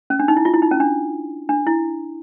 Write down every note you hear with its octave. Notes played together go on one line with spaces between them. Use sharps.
C#4
D4
D#4
E4
F4
E4
D#4
C#4
D4
D4
E4